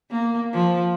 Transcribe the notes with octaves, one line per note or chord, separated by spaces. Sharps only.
A#3
F3